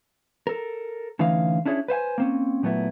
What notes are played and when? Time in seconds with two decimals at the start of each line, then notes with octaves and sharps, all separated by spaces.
0.47 A4 A#4
1.19 D3 E3 A3 C#4 D#4 F5
1.65 C#4 D4 E4 G#4 C5 C#5
1.88 B4 C5 F5 G#5
2.18 A#3 C4 C#4
2.63 A#2 F#3 A3 B3 E4